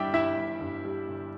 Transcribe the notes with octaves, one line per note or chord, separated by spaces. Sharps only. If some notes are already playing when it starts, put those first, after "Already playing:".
Already playing: G1 G2 G3 D4 E4 G4 E5 G5
G1 E4 E5
G1
G2
G3
G1